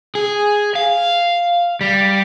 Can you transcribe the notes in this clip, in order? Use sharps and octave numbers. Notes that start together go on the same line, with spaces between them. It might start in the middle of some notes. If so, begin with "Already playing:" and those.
G#4
F5
G3